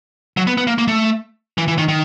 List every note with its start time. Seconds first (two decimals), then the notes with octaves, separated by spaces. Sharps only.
0.37 F#3
0.47 B3
0.58 B3
0.67 A#3
0.78 A#3
0.88 A3
1.58 E3
1.68 E3
1.78 D#3
1.88 D#3